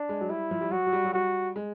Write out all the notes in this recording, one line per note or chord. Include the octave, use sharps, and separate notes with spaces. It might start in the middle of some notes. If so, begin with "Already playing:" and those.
Already playing: D4
G#3
F#3
G3 E4
F3
G3
F#3 F#4
F#3
G3
F#3
G3 F#4
G#3